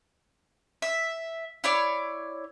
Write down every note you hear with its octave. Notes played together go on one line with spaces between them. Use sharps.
E5
E4 C#5 D5